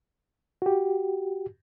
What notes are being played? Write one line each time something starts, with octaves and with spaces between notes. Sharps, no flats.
F#4 G4